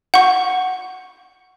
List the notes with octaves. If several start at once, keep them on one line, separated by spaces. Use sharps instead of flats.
F#5 C#6